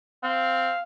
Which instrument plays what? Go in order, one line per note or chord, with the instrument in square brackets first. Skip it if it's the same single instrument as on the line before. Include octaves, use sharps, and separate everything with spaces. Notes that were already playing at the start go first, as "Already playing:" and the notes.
[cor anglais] C4 [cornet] F5